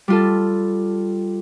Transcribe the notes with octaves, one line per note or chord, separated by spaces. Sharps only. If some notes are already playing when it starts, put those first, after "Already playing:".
G3 F4 A4